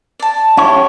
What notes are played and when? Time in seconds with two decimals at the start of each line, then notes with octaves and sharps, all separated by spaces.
0.20 D5 A5
0.57 C#4 E4 G4 C#5